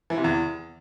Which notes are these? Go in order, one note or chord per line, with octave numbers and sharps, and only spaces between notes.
E3
C3
E2